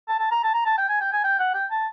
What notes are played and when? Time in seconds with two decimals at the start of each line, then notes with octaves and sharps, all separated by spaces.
0.08 A5
0.19 A5
0.31 A#5
0.43 A5
0.54 A#5
0.66 A5
0.78 G5
0.89 G#5
1.01 G5
1.13 G#5
1.24 G5
1.39 F#5
1.54 G5
1.71 A5